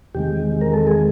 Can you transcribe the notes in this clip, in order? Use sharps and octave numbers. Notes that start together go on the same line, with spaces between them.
E2 C3 D#3 G#3 G4
A#4
A4
G#4